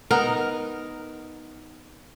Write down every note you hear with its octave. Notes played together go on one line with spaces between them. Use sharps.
B3 D#4 A#4